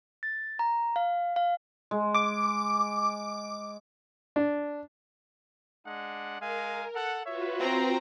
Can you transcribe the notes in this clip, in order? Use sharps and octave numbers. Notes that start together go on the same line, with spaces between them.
A6
A#5
F5
F5
G#3
D6
D4
G#3 D4 F#5
G#3 A#4 F5 G#5
A4 F#5
F4 F#4 B4 C#5 E5
C4 A#5